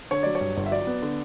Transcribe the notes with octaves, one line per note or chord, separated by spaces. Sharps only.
D3 C#5
F#3 D5
C#5
G2
G1
E5
F#3 D5
B3
D3